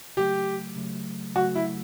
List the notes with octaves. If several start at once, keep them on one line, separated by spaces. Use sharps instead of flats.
C#3 F#3 A3 G4
C#3 F#3 A3
C#3 F#3 A3 F#4
E4